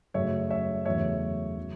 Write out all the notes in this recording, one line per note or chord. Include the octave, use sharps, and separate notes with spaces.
F#2 C#3 F#3 A3 C#5 E5
C#5 E5
E2 C#3 F#3 A3 C#5 E5
C#3 F#3